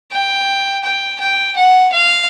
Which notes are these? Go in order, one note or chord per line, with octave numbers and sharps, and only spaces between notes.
G5
G5
G5
F#5
F5